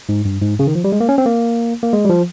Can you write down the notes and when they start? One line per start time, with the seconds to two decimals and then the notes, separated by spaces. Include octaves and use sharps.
0.09 G#2
0.25 G2
0.42 G#2
0.59 C#3
0.67 D#3
0.75 F3
0.84 G3
0.92 G#3
1.00 A#3
1.09 C#4
1.18 C4
1.26 A#3
1.83 A#3
1.93 G#3
2.05 G3
2.10 F3